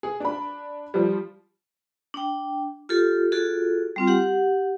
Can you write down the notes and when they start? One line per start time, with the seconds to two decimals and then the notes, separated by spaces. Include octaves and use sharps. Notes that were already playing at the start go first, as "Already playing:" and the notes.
0.03 G#4
0.20 D4 B5
0.94 F3 G3
2.14 D4 G5
2.89 F4 G4 A4
3.32 F4 F#4 G#4 A4
3.96 G3 C4 F4
4.08 G4 F#5